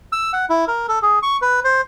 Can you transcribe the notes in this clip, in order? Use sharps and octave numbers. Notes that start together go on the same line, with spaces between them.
E6
F#5
E4
A#4
A4
G#4
C#6
B4
C5